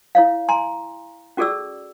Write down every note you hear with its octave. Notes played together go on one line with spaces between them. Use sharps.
E4 C#5 F5
G#5 A#5 C6
C#4 F#4 G#4 A4 D5 E6